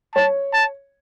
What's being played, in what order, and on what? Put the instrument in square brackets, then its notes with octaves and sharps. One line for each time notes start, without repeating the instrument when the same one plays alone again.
[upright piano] C#5 [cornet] A5
[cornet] A5